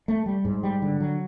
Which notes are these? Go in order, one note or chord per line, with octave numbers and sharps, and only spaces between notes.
A3
G3
G#2
G3
D3
F#3